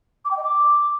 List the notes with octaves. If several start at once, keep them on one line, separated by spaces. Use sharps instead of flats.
D6
G5
D#5
D6